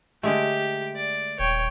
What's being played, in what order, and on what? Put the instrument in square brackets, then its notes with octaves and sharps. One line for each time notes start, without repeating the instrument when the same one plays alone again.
[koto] D3 G#3 A3 [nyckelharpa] G4
[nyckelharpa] D5
[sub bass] D#1 [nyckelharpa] C#5 G5